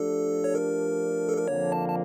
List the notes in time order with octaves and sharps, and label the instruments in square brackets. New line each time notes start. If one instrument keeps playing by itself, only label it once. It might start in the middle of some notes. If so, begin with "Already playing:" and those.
Already playing: [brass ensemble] F3 A3 D4 G4 [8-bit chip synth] A4
[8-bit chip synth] C#5
A#4
A4
A#4
[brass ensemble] F2 D3 F3 A#3 D4 [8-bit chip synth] C#5
[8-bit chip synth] A5
A5